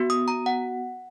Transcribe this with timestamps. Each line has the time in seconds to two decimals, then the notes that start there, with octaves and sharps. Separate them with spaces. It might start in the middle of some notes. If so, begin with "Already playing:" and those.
Already playing: B3 F#4
0.10 D#6
0.28 A#5
0.46 F#5